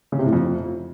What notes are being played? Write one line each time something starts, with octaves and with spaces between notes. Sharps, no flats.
C#3
C3
A2
F2